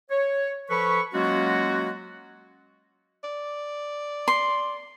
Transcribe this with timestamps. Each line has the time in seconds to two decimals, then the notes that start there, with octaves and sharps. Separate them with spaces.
0.10 C#5
0.70 F3 A4 B4 B5 C#6
1.14 F#3 G#3 A#3 C#4 F4 F#4
3.24 D5
4.28 C6